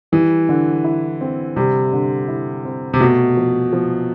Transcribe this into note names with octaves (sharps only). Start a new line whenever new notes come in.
E3 G3
D3
E4
C4
C3 G3
D3
E4
C4
C3
B2 A3
F3
F3